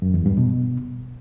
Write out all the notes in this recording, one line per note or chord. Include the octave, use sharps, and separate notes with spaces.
F#2
E2
G2
B2